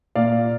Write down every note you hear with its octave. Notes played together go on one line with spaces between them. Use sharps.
A#2 D5 F5